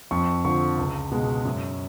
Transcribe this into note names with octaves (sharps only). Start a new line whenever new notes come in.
F2 C#6
D3 F3 C#6
C#2
B2 G#3
F#2